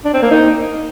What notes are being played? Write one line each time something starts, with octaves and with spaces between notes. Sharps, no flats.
D4
C4
A#3
D#4